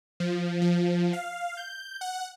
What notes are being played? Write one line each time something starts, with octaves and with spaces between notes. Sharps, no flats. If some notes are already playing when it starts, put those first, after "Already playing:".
F3
F3
F5
G6
F#5